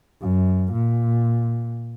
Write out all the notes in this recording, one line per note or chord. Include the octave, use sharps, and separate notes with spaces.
F#2
A#2